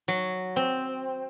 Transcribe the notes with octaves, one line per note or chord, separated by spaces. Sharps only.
F#3
C4